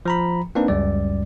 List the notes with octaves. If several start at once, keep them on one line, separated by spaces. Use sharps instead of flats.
F3 A#5 B5
A#3 C4 D4 D#4 B4
C#2 F#2 G3 D5